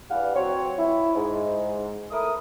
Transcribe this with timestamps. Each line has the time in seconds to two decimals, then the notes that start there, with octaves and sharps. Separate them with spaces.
0.10 E2 G2 E3 G3 F5 F#5
0.35 F#3 C4 C#5
0.78 E4
1.16 G#2
2.11 A3 E4 A#4 D#6